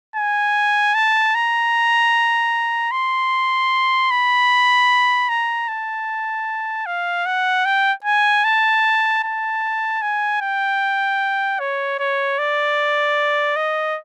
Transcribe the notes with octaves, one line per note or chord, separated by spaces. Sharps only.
G#5
A5
A#5
C6
B5
A#5
A5
F5
F#5
G5
G#5
A5
A5
G#5
G5
C#5
C#5
D5
D#5